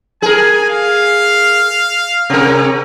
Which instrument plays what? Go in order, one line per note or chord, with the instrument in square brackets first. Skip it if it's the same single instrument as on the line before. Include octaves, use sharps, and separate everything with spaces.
[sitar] G#4 A#4 [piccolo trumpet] G#5
[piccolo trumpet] F5
[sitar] C3 A#4